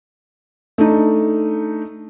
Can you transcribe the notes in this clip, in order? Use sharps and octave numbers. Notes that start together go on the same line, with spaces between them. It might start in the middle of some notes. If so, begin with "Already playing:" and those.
A3 D4 D#4